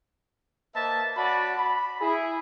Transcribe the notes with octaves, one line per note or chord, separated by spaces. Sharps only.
A#3 B4 C5 D#5 E5 A5
F#4 C#5 D5 A5 B5
B5
E4 G#4